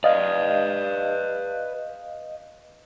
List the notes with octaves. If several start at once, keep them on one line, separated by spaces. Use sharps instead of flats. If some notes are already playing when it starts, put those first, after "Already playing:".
B4 D5 D#5 F5